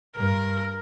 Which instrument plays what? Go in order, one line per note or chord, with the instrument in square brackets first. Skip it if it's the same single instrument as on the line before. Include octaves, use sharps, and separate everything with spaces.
[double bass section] G2 [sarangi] A#4